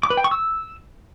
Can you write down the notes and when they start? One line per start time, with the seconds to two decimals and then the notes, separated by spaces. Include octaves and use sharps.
0.03 D6
0.10 B4
0.17 G5
0.24 C#6
0.31 E6